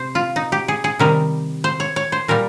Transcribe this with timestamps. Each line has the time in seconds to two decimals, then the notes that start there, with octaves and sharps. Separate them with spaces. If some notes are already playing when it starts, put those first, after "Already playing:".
Already playing: C3 C5
0.15 F4
0.36 D#4
0.52 G4
0.68 G#4
0.84 G#4
0.99 C3 D#3 G3 A#4
1.64 C5
1.80 C#5
1.96 C#5
2.12 C5
2.28 A#2 G3 A#4